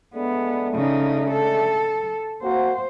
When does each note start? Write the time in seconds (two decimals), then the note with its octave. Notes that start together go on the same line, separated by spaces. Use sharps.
0.15 G#3 A3 B3 D4
0.74 C#3 D#4
1.31 A4
2.43 A#3 C4 F#4 C5